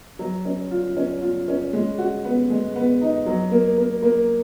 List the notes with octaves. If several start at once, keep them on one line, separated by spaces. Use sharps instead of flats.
F#3
C#4
F4
C#4
F4
C#4
G#3
F#4
B3
G#3
B3
D#4
F#3
A#3
A#3
A#3